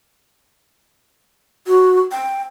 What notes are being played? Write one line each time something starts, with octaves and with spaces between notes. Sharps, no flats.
F#4
G5